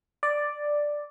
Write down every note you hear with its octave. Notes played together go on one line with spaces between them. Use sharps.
D5